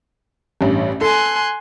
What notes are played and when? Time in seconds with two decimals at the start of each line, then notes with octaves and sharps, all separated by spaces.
0.61 A1 G2
1.01 A4 G#5 C6 F#6